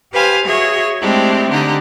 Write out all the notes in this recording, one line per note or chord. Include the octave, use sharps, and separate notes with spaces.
G4 B4 C5 F5 G#5
F#4 G#4 C#5 E5
G#3 A3 C4 D4 E4 G4
D3 D#4 G4 F#5